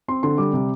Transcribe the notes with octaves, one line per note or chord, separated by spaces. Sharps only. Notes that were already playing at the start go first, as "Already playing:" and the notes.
C4 C6
D3 C6
G3 D6
C3